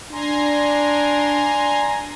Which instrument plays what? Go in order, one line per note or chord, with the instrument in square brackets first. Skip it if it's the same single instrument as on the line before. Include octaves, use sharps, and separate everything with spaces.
[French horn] D4 [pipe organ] G#5 A#5 C6